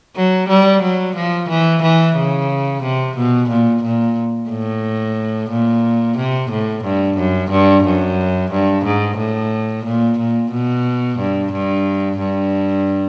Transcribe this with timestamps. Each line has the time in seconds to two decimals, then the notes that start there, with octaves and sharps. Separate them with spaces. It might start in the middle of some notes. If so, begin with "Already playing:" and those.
0.16 F#3
0.49 G3
0.83 F#3
1.15 F3
1.49 E3
1.83 E3
2.17 C#3
2.83 C3
3.17 B2
3.49 A#2
3.83 A#2
4.50 A2
5.50 A#2
6.17 C3
6.51 A2
6.84 G2
7.18 F#2
7.51 G2
7.84 F#2
8.52 G2
8.85 G#2
9.18 A2
9.85 A#2
10.18 A#2
10.52 B2
11.19 G2
11.53 G2
12.20 G2